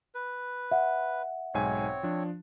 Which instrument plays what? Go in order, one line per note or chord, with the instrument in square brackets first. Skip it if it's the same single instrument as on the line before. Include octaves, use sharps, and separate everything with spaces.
[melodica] B4
[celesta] E5 F#5
[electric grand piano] B1 G#2 G#5 [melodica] C4 C#5
[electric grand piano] F3 D4